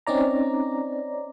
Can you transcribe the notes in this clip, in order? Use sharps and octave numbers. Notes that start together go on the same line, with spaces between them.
C4 C#4 D#4 D5 A#5